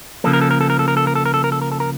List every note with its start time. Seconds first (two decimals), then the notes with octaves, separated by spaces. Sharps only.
0.24 C#3 F3 A#3 A4
0.33 A#4
0.41 A4
0.51 A#4
0.61 A4
0.70 A#4
0.79 A4
0.88 A#4
0.97 A4
1.07 A#4
1.15 A4
1.26 A#4
1.34 A4
1.44 A#4
1.52 A4
1.62 A#4
1.72 A4
1.80 A#4